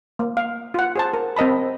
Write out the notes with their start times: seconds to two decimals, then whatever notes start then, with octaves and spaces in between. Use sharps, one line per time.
0.19 A#3
0.37 F5
0.74 F4 F#5
0.96 G#4 C5 A5
1.14 A#4
1.36 C4 A#4 D#5 A5 B5